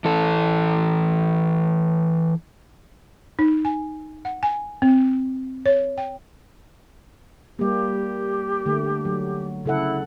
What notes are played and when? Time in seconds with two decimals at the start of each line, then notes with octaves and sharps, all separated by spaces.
0.05 E3 A4
3.39 D#4
3.65 G#5
4.25 F#5
4.43 G#5
4.82 C4
5.66 C#5
5.98 G5
7.59 G3 A#3 G4
8.66 D3 A3
9.05 F#3
9.66 C#3 E4 A4 F#5